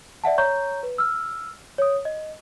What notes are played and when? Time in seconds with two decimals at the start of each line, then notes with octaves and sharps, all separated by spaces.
0.24 D5 E5 F#5 A5
0.38 C#5 A#5 C#6 G6
0.83 B4
0.98 E6 F6
1.78 C#5 D#6
2.05 D#5